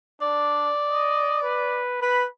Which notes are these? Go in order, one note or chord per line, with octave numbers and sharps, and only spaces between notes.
D4 D5
D#5
B4
B4 B5